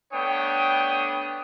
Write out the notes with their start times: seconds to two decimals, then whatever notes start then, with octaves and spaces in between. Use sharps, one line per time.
0.12 A3 B3 D4 C#5 G5 D#6